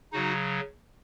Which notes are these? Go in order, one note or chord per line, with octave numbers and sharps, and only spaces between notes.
C#3 F#3 D#4 F#4